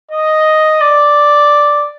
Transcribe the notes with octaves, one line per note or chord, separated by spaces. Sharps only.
D#5
D5